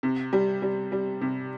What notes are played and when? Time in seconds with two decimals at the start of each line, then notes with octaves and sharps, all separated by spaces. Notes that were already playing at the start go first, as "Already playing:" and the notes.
0.03 C3
0.33 G3
0.62 G3
0.92 G3
1.21 C3